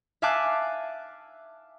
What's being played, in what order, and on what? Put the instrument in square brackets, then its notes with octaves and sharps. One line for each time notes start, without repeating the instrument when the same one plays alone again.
[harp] E5 F5 G#5 A5 D6 F#6